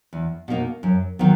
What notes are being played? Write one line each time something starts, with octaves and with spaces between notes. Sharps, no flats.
E2
B2 A#3 D#4
F#2
D#3 F#3 B3